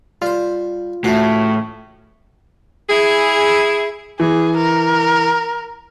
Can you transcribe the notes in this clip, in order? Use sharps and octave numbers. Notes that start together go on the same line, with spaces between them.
G3 F4 C5
A2 C#3 E3 A3 F#4
E4 G#4
E3 G#4
A#4